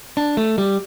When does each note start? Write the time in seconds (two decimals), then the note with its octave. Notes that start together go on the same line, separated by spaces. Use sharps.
0.17 D4
0.37 A3
0.58 G3